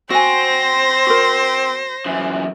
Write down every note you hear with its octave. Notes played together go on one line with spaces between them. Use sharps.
C4 F#4 C5 G#5 A#6
F#4 A#4
F#2 E3